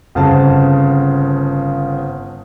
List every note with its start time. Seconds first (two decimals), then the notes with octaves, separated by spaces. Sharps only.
0.15 G1 C#3 C4 F#5 A5